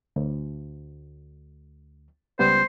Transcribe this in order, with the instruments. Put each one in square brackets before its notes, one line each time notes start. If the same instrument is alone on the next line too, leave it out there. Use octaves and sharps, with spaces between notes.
[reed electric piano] D2
[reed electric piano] C#2 G3 B3 [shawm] C5